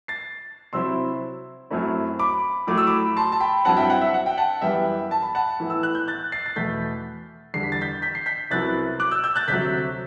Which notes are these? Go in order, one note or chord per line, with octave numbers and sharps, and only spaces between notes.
A6 C7
C3 F#3 C4 E4 C6 E6
F#2 F#3 A3 C4 E4
B5 D6
A2 F#3 A3 D6
E6
B5 D6
A5 C6
A5
G5 B5
G2 F#3 C4 E4 F#5 A5
E5 G5
F#5
E5
F#5
G5
F#5 A5
F#2 E3 G3 B3 E5 G5
A5
B5
F#5 A5
A2 E3 B3 E4
E6
F#6
G6
F#6 A6
A6 C7
A6
E2 B2 A3 G6 B6
E2 D3 G3 C7
B6
A6
G6 B6
G6 B6
C7
G6 B6
C2 C3 F#3 B3 E4 F#6 A6
D6 F#6
E6 G6
E6 G6
F#6 A6
D2 C3 F#3 G6 B6